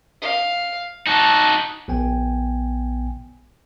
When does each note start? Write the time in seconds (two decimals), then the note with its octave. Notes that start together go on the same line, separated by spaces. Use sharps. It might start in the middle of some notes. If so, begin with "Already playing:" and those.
0.21 F5
1.07 D#4 F#4 A5
1.88 A#1 B3 G5 G#5